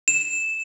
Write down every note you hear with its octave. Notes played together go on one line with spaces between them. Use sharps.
E7